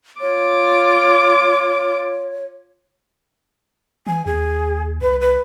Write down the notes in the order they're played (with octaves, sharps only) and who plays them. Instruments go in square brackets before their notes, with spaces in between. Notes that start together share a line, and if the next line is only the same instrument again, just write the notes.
[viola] F4 D6 [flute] C#5
[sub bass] E3 [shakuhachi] G#5
[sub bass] D#2 [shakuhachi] G#4
[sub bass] C2 [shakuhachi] B4
[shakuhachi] B4